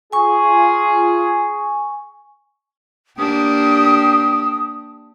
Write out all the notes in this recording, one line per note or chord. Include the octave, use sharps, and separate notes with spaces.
F4 G#4 G#5 C#6
A#3 D4 G4 D#6